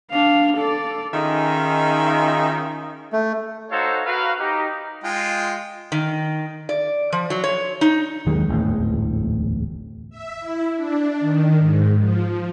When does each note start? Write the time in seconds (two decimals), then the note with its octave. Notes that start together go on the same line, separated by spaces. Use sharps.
0.12 D4 F5
0.58 A4 D5
1.13 D#3 C#4 D#4 F4 G#4 E5
3.13 A3
3.71 D#4 F#4 A4 C5 C#5 F5
4.05 F#4 A#4 B4 F5
4.39 D#4 G4
5.04 G#3 F4 G5
5.92 D#3
6.69 D5
7.12 F3
7.30 F#3
7.44 C#5
7.81 D#4
8.26 D#2 D#3 F#3 G#3
8.48 D1 A1 E2 G#2
10.10 E5
10.40 E4
10.75 D4
11.20 D#3
11.59 G#2
11.99 F3